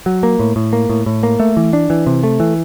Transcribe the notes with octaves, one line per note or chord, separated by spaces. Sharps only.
F#3
A#3
A2
A2
A#3
A2
A2
A#3
A3
E3
D4
E3
C3
A3
E3